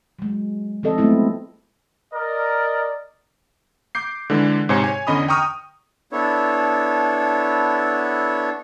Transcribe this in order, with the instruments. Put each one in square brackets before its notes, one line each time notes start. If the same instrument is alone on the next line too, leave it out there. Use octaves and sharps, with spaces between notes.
[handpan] F#3 G#3
F3 C4 A4 D#5
F#3 G#3 A3 B3 C4 E4
[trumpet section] A#4 D5 D#5
[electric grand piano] D6 G6 C7
D3 E3 G#3 D4
G#2 C3 C5 C#5 G#5 C#7
C#5 G#5
E2 D3 C#4 D#5 B5 D#6
G5 A#5 C#6 D#6 F6
[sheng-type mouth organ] B3 D4 E4 A4 C#5